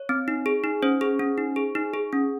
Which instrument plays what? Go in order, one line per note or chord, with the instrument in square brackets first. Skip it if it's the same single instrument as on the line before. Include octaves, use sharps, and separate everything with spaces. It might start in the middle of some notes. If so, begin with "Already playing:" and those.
Already playing: [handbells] C#5
C4
D#4
G#4
D#4
C#4 C5
G#4
C#4
D#4
G#4
D#4
G#4
C#4